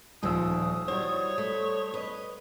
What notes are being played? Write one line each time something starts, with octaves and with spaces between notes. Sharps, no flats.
D#1 D2 B2 D#3 F3 D#6 E6
G3 E4 F#4 C5 C#5
A3
B4 D#5